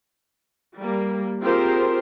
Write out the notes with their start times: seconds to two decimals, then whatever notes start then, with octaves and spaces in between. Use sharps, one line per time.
0.78 G3 A#3
1.41 C4 F4 G4 G#4 A#4 C5